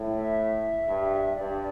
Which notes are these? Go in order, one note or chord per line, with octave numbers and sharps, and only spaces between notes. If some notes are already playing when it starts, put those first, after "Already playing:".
Already playing: A2
E5
G2
G2 D5